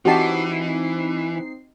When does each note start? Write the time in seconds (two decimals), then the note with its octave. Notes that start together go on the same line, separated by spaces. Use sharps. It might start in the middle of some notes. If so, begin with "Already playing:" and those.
0.05 E3 C4 D#4 F#4 G4 A5 C7